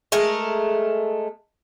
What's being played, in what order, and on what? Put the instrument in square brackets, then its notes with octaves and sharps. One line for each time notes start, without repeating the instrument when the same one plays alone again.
[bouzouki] G#3 A3 A#4